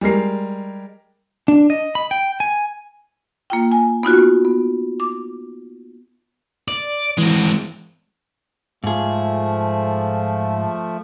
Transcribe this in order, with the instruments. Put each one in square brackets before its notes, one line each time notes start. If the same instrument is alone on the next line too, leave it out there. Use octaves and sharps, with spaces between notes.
[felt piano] G3 G#3 A#4 C7
[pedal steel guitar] D4
D#5
B5
G5
G#5
[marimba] A#3 F4 G5
G#5
B3 D#4 F4 F#4
B3
D6
[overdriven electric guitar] D5
[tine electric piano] E3 [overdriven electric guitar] G#3 C4
[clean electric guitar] G#2 G#4 [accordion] F3 A3